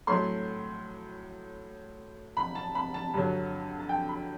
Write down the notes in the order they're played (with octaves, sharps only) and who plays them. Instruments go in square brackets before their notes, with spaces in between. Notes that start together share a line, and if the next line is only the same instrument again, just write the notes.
[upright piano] A2 F#3 A3 C6
B5
A5
B5
A5
G2 D3 F#3
A5
G5
B5